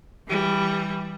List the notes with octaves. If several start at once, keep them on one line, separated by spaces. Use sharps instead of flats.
E3 G3